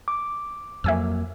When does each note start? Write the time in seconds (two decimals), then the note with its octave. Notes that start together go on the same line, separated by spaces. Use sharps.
0.08 D6
0.84 F2 F#3 A#3 E5 G#5 E6